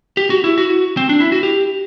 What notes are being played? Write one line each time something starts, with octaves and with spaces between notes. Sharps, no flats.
G4
F#4
E4
F#4
C4
D4
E4
F#4
G4